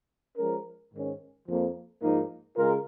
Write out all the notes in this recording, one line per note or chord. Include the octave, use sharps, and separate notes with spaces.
F3 G#3 C#4 A#4
G#2 D#3 C#4
F2 F3 A#3
G#2 F3 A#3 D#4
C#3 G#3 F4 A#4